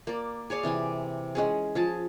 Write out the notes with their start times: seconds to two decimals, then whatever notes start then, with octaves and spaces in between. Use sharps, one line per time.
0.07 A#3 D5
0.50 G#4 C#5 D5 F5
0.63 C3 E3 C4 G#5
1.35 G#3 C#4 G#4
1.75 F3 G#4 A5